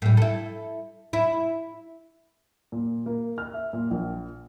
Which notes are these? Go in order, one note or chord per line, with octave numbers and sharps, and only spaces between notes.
A2 G3
E4 A4
E4
A#2
A#3
F6
E5
A#2
A#1